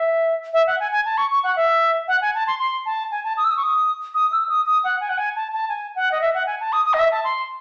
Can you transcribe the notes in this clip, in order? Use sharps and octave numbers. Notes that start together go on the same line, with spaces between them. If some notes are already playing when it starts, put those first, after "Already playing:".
Already playing: E5
E5
F#5
G#5
G#5
A5
C#6
C#6
F#5
E5
F#5
G#5
A5
C6
C6
A5
G#5
A5
D#6
E6
D#6
C#6
D#6
D#6
E6
D#6
D#6
F#5
G#5
F#5
G#5
A5
A5
G#5
F#5
D#5
E5
F#5
G#5
A5
D#6
D#6
D#5
E5
A5
C6